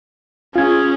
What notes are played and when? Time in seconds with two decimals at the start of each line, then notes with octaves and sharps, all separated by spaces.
0.56 C#4 F4 G#4 G#6